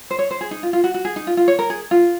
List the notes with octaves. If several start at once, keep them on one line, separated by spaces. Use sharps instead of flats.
C5
C#5
C5
G#4
D#4
F4
F4
F#4
F#4
G#4
D#4
F4
F4
C#5
A#4
G#4
F4